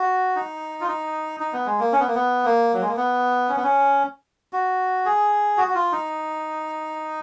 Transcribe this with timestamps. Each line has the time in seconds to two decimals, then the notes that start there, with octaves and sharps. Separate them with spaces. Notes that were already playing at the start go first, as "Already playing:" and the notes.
Already playing: F#4
0.36 D#4
0.81 F4
0.88 D#4
1.40 D#4
1.53 B3
1.66 G#3
1.80 A#3
1.92 C#4
1.99 B3
2.08 A#3
2.15 B3
2.45 A#3
2.74 F#3
2.82 G#3
2.89 A#3
2.97 B3
3.49 C#4
3.56 B3
3.64 C#4
4.53 F#4
5.06 G#4
5.57 F#4
5.68 F#4
5.75 F4
5.92 D#4